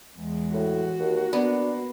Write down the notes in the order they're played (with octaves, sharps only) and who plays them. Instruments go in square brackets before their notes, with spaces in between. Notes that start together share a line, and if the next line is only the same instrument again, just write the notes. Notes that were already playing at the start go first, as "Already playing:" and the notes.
[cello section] E2 G#3
[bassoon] A2 [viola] F#4
[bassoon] D#2 [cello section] A#3
[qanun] B3 [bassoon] D4